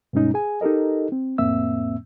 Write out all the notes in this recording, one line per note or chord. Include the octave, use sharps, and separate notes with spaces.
G2 B2 G#3 C#4 D#4
G#4 G#5
D#4 G4 A4 A#4 D#5
C4
F2 A2 A#3 C4 E5 E6